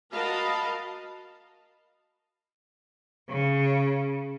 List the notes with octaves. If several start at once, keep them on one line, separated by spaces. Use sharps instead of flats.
F#4 A#4 D#5 F5 A5 B5
C#3